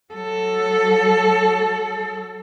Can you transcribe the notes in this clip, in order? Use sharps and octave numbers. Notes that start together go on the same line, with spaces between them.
F#3 A4